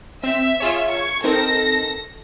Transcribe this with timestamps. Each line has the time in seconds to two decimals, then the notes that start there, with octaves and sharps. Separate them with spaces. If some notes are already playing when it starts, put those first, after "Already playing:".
0.23 C4 E5
0.60 F4 G#4 C#5
0.90 C#6 G#6
1.24 C4 D#4 A4 A#4 A#6